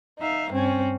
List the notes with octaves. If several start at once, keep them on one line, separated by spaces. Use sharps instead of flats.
D#4 E5 F5
G2 C4 C#4